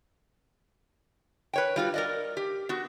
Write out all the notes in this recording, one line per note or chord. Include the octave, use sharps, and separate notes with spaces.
B4 C#5 G5
G3 F4 F#4
A#4 D5 D#5
G4
B3 F#4